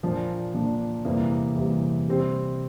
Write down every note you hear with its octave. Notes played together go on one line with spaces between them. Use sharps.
A#2 F3 A#3 D4
A#2 F3 A#3 D4
E2 C3 G3 A#3
E2 C3 G3 A#3
C3 G3 C4